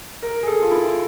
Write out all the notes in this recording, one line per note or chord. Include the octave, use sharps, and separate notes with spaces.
A#4
G#4
A4
F4
E4